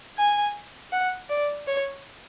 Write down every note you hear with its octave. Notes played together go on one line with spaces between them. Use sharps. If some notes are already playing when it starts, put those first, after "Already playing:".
G#5
F#5
D5
C#5